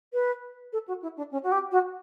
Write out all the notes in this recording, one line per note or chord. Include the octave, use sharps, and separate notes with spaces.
B4
A4
F#4
E4
D4
C#4
F#4
G4
F#4